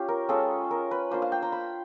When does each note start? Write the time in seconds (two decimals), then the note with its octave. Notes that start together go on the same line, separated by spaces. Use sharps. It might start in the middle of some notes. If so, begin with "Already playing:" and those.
Already playing: C#4 F4 G4
0.08 A#4
0.29 G#3 C#4 F4 A4
0.71 A#4
0.91 B4
1.11 A#3 D4 F4 C5
1.22 F5
1.32 G5
1.42 A#5
1.52 B5